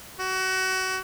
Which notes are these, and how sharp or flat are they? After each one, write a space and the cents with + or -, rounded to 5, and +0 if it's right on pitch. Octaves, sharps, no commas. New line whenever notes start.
F#4 +25